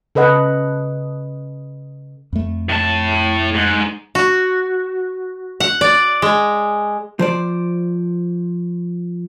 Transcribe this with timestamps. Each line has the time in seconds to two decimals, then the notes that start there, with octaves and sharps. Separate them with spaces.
0.15 C#3 A4 B4 D#5 F#5
2.33 F2 A3
2.69 A2 A5
3.55 G#2
4.15 F#4
5.60 F#5
5.81 D5
6.22 G#3
7.19 F3 C5 D5